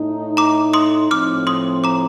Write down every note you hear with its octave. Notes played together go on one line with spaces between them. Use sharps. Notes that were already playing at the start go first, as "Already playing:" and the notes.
Already playing: A2 A3 D#4
A#5 D6
C6 D#6
A2 F3 C4 D6 F6
C6 D#6
A#5 D6